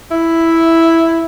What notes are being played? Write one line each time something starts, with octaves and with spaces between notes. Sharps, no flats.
E4